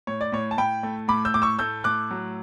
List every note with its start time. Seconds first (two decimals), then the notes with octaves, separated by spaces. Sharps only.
0.07 A2 C#5
0.21 D5
0.32 A2 C#5
0.51 A5
0.58 A2 G5 B5
0.83 A3
1.08 A2 B5 D6
1.25 E6 G6
1.34 A2 D6
1.42 C#6 E6
1.59 A3 E6 G6
1.84 A2 D6 F#6
2.11 F#3